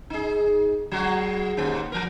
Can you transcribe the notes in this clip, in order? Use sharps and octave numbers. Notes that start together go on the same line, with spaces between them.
D#4 G#4
F#3 G#3 F#4
D#2 G#2 A#3
F3 A#4